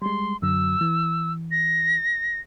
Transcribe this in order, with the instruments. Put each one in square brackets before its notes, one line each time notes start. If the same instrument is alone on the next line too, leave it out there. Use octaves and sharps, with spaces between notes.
[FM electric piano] G3 G#3 [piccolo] C6
[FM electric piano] F#2 D3 F#3 [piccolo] E6
[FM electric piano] E3
[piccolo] A#6